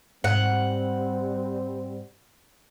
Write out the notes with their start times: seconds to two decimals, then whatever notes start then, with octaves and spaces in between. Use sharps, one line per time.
0.24 G#2 G3 C4 F#5